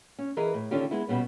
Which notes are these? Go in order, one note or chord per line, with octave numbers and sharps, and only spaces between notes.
C#4
E3 G#4 A#4 B4 D#5
A2
D3 D#3 C#4 F4 G4
G#3 B3 E4
B2 G3 B3 C#4